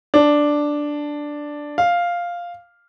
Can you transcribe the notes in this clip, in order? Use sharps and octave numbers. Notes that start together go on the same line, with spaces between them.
D4
F5